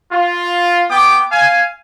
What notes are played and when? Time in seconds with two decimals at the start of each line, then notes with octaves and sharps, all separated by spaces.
0.11 F4
0.89 B3 G5 D6
1.31 F5 G#5